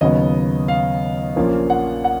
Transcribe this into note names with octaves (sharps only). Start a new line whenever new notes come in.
D#2 C#3 F#3 B3 D#5
F5
A#1 A#2 F3 A#3 C#4
F#5
F#5